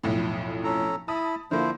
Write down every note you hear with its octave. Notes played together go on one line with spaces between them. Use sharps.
B1 F2 A2
C#4 A4 A#5
E4 A5 B5 D#6
D3 F3 A#3 E4 C5